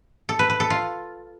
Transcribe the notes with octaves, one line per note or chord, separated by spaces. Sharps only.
A4
B4
B4
A4
F4